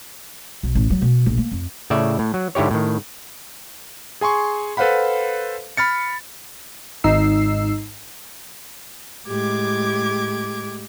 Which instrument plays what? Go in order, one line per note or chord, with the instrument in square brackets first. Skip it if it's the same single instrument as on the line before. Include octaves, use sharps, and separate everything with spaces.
[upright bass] B1
A1
F#3
B2
A#1
A#3
F2
[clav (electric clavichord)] A2 C#3 D5 E5
A2
F#3
G#2 D3 E4 G4 C#5
A2 D#3
[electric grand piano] G#4 G#5 C6 C#6
A4 B4 C5 F5 F#5 B5
B5 F6 A6 C#7
[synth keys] G#1 D#4 E6 C7
[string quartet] A2 G#3 G4 D6 G#6